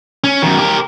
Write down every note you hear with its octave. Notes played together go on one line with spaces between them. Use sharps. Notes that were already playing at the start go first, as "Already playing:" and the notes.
C#4
F#2 D#3
G4 A#4